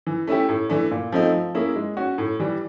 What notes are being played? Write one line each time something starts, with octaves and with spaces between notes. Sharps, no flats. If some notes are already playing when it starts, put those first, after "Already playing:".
E3
A3 C#4 E4 G4
A2
E3 A3 D4
A#2
F3 A3 C4 D#4
F3
A#3 C#4 E4 G#4
G#3
C#4 F#4
A2
E3 G3